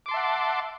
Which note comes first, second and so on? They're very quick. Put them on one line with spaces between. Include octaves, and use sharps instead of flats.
D6 C6 A5 E5 F#5